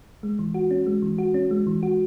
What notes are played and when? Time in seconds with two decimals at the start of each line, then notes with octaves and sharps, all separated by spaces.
0.23 G#3
0.39 E3
0.54 F#4
0.71 C#4
0.86 G#3
1.02 E3
1.18 F#4
1.34 C#4
1.51 G#3
1.67 E3
1.83 F#4